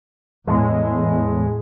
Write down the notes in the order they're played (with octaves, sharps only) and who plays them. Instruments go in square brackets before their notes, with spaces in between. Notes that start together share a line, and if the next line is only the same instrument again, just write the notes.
[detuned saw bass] E2 [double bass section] A2 [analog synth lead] G#3